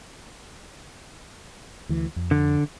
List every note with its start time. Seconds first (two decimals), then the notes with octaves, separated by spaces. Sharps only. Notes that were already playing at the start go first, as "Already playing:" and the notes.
1.89 D2 E3
2.16 F2
2.31 D3